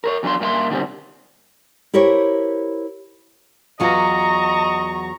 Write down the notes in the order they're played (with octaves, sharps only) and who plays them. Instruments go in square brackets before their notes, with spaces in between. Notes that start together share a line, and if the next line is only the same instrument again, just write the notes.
[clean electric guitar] A#4 C5 C#5
E2 F#3 D4 A#4 F5 C6
G2 A#3 C4 E5 C6
B2 D3 D#3 G3 C4 C#4
[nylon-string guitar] E4 G4 A#4 C5 C#5
[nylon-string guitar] E2 F#3 F4 [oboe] D#5 [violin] A#5 C#6